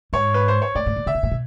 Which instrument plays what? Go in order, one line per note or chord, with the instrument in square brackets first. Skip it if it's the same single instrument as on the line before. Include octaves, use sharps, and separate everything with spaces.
[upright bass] G#2 [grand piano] C#5
[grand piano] B4
C5
C#5
[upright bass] A2 [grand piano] D5
[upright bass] A2
A#2
[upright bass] C3 [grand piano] E5
[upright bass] B2
A#2
B2